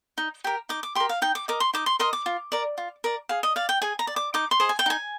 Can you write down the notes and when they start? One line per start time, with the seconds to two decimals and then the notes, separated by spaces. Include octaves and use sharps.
0.18 D#4
0.44 G4 A#4
0.69 D#4 D6
0.83 D6
0.95 G4 C6
1.00 A#4
1.09 F5
1.22 D#4 G5
1.35 D6
1.48 A#4 D#5 D6
1.60 C6
1.74 D#4 D6
1.86 C6
1.99 A#4 D#5 C6
2.13 D6
2.26 F4
2.52 A#4 D5
2.78 F4
3.04 A#4 D5
3.29 G#4 F5
3.43 D#5
3.56 D5 F5
3.69 G5
3.82 G#4 G#5
3.99 A#5
4.07 D5
4.16 D6
4.34 D#4 D6
4.51 C6
4.60 G#4 C5 D#5
4.69 G#5
4.79 G5
4.86 D#4 G#5